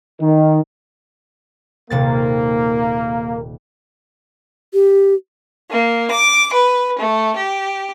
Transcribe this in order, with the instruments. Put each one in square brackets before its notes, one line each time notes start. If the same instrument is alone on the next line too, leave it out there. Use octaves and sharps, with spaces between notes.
[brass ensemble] D#3
[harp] D#1 C3 A6 [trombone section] A#3
[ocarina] G4
[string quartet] A#3
D6
B4
A3
G4